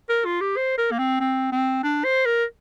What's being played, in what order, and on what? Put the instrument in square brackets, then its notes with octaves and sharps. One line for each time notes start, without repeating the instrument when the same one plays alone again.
[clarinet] A#4
F4
G4
C5
A#4
A#3
C4
C4
C4
D4
C5
A#4